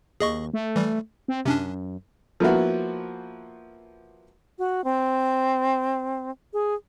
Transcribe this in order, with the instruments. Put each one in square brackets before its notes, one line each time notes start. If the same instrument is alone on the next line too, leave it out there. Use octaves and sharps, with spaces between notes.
[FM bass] D#2 [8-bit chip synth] G#4 D#5 C#6
[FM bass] A3
[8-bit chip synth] E3 G3
[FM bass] C4
[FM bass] F#2 [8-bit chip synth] C3 C#4 D4
[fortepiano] F3 A#3 B3 E4 F#4
[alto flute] F#4
C4
G#4